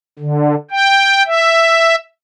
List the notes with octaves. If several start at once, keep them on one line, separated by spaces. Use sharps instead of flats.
D3
G5
E5